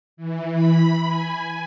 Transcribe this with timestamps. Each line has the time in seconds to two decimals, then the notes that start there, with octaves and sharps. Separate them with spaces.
0.17 E3
0.54 B5
1.07 G#5